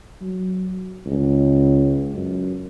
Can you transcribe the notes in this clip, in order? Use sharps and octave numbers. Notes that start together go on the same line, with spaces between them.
F#3
C#2
F#2